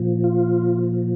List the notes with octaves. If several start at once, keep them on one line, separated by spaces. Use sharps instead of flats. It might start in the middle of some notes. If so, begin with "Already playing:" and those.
Already playing: A#2 F3
F4